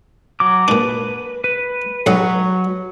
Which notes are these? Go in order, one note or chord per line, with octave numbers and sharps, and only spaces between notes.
F#3 D6
A#2 D4 B4
B4
B1 F#3 D#5